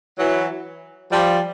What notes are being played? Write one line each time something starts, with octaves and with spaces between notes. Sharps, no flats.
E3 F#3
F3 G3